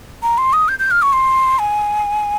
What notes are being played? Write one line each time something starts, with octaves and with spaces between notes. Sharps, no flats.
A#5
C6
D#6
G6
G6
F6
C#6
C6
G#5